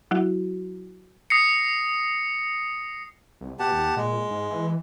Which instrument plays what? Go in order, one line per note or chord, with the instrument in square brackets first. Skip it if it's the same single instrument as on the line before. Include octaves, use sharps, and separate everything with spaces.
[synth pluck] F#3 E4 F#4
[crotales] D#6 A#6 C7 C#7
[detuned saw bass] C2
[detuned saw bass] B2 [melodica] G4 F#5 A5
[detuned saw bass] D#2
[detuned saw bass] A#2 [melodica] G#3
[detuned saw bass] G#2
E3